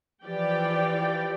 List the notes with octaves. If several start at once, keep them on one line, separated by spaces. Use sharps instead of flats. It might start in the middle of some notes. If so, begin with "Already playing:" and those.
E3 F3 G4 D5 G5